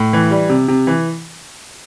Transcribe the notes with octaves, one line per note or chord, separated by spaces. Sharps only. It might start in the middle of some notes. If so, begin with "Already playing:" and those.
Already playing: A2
E3
G3
C3
C3
E3